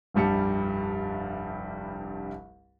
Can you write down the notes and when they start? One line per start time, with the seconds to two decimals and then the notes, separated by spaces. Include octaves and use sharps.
0.14 F1 C2 G2 G3 A5 C#7